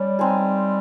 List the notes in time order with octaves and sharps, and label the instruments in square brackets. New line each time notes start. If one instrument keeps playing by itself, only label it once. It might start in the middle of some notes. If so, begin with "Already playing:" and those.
Already playing: [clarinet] G3 [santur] C#4 D5
[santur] G#3 C4 D#4 G#4